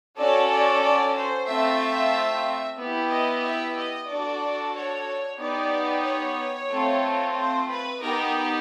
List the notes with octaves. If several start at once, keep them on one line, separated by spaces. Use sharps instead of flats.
C#4 F#4 A4 D5
D5
D5
C5
A3 C4 F4 E5
B3 E4 G4
D#5
E5
D#5
D4 F#4 A4 D5
C#5
B3 D#4 G4 D5
C#5
A3 C4 F4
C5
B4
B3 D#4 G4 A#4